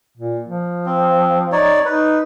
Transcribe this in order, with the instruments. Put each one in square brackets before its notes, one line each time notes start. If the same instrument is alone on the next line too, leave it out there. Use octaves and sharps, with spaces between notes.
[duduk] A#2
F3
[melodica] C4
D#4 C#5 D5
[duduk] D#4 [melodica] B4